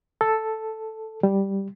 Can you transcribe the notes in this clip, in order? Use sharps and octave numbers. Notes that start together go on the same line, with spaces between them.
A4
G3